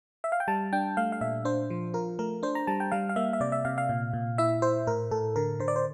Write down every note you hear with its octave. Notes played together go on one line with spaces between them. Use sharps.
E5
F5
G5
G3 A5
D4 G5
A3 F5
F5
A#2 E5
D4 C5
F3
F4 A#4
A3 A#4
D4 C5
A#5
G3 A5
G5
G3 F5
F5
A#3 E5
E5
C3 D5
E5
C3 F5
F5
A#2
A#2
E4 E5
E4 C5
A2 A#4
A2 A4
D3 A#4
D3 C5
D5
C5